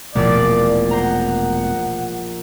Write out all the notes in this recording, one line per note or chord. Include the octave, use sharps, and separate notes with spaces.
E1 A#1 B2 A3 E4 F4 D5
C5 F#5 A#5